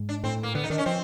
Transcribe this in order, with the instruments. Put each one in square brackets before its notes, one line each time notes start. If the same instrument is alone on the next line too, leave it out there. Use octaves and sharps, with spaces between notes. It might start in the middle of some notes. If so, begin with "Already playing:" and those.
Already playing: [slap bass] G#2
[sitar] D4
[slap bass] A2 [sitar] C4
[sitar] A#3
[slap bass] D3 [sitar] B3
[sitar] D#4
[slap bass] D#3 [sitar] D4
[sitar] C#4
[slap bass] F3 [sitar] C4